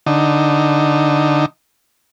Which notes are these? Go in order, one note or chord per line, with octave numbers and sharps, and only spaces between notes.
D3 D#4